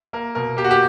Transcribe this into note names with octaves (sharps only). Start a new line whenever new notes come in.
A#3 A#4
B2 A#4
A#3 G4
F#4
G4